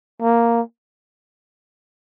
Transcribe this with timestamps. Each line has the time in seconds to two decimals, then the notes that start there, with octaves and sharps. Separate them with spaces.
0.22 A#3